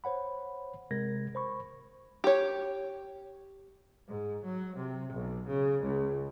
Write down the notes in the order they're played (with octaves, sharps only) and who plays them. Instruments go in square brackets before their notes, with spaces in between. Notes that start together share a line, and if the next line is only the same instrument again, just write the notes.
[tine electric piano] C5 C#5 F#5 B5
C3 G#3 A#4 G#6 A#6
C5 B5 C#6
[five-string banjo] G4 C#5
[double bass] G#2
F#3
C3
B1
C#3
C#2